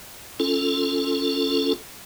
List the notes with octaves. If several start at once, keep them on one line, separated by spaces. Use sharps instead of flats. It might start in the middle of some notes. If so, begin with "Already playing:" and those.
C#4 F4 A4